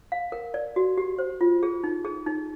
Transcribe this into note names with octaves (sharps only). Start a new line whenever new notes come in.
F5
A#4
D5
F#4
G4
C5
F4
G#4
D#4
G#4
D#4